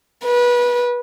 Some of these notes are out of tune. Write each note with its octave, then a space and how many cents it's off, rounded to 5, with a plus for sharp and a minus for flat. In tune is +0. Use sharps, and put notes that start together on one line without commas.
B4 -25